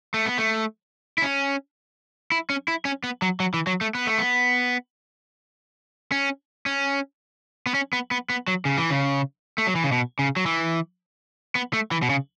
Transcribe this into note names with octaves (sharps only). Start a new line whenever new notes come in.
A3
B3
A3
E4
C#4
E4
C#4
E4
C#4
B3
F#3
F#3
E3
F#3
A3
B3
A3
B3
C#4
C#4
B3
C#4
B3
B3
B3
F#3
C#3
E3
C#3
A3
F#3
E3
C#3
B2
C#3
F#3
E3
B3
A3
E3
B2
C#3